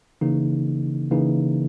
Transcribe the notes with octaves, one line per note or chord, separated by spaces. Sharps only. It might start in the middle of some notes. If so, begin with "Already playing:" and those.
C#3 E3 A#3 D#4
C#3 E3 A#3 D#4